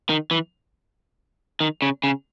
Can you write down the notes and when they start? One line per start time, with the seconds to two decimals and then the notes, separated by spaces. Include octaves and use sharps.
0.09 D#3
0.31 E3
1.60 D#3
1.82 C#3
2.04 C#3